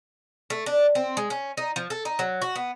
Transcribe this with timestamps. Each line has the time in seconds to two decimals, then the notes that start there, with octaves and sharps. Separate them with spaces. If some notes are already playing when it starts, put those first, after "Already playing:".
0.50 A3
0.66 D4
0.95 C4
1.17 G#3
1.30 C#4
1.57 D#4
1.76 F3
1.90 A4
2.05 D#4
2.19 F#3
2.42 F#4
2.56 B3